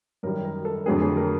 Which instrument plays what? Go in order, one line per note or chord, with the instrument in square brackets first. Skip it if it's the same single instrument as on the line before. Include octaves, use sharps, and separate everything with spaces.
[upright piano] F#2 D#3 G3 A#4
A#4
A4
F2 D3 F#3 A3 G#4
G#4
A#4